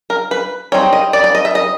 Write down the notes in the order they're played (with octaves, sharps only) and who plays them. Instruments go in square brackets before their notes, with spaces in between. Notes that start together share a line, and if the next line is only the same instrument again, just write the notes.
[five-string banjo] A#4
B4
G3 C4 D#4 C#5
D#5
D5
D5
D#5
E5
D#5